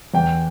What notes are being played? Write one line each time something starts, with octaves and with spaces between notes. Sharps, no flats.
E2 G5